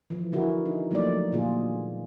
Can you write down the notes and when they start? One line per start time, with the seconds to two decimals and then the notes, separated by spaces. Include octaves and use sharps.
0.10 E3 F3
0.32 D3 D4 E4 F#4 G#4 A#4
0.66 D#4
0.91 F3 F#3 A3 A#3 D#4 D5
1.32 A#2 D3 E3 F4 F#4 G#4